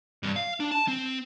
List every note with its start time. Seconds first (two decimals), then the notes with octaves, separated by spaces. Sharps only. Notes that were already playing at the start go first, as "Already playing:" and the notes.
0.23 G2 C3
0.36 F5
0.60 D4
0.71 A5
0.88 C4